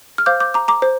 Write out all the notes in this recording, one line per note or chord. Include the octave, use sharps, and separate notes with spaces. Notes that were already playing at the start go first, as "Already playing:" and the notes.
F6
C5 F5 D6 G6
D6 G6
A#5 D6
A#5 D6
C5